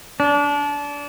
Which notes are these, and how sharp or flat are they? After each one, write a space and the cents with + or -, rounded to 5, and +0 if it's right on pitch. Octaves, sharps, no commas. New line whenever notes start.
D4 -25